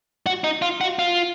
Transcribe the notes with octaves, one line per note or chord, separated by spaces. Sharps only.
F#4
D#4
F4
F#4
F4